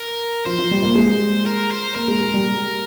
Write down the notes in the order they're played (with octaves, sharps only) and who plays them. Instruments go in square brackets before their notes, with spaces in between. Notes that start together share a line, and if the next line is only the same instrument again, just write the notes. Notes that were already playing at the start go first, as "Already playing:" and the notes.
Already playing: [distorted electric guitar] A#4
[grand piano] F3 [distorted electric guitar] C5
[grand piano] F3
G3
A#3
G#3
[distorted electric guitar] A#4
C5
[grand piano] A#3 [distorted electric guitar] A#4
[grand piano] G#3
G#3
G3